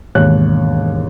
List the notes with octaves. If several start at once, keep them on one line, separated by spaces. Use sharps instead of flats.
E1 D#2 G#2 C#5 F#6